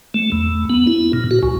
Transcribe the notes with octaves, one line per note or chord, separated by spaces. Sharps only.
A3
E2
B3
E4
A#2
F#4
C#2